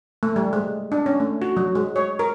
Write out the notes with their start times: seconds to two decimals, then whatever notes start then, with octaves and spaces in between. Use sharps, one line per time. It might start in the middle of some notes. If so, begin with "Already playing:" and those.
0.23 A3
0.36 G3
0.53 G#3
0.92 D4
1.06 C#4
1.20 A3
1.42 F#4
1.57 F#3
1.75 G#3
1.96 C#5
2.19 A#4